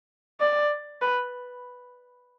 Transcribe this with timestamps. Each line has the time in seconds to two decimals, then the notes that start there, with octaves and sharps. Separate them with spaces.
0.40 D5
1.01 B4